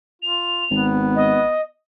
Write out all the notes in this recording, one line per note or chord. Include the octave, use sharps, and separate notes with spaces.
F4 F7
G#1 B3
D#5